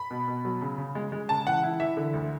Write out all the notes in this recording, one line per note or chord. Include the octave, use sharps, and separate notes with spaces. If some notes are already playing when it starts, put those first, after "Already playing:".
Already playing: B5
B2
B2
F#3
C#3
C#3
G#3
G#3
C#3 A5
E3 F#5
E4
E3 E5
D3
D2